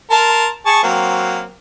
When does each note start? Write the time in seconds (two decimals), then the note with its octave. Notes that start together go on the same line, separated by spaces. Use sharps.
0.11 A#4 A5 C6
0.66 G#4 A5 C#6
0.83 F#3 A#3 C4